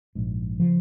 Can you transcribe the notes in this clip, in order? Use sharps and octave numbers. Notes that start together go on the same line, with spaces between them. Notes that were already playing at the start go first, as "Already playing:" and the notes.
A#1 G#2
C#3 F3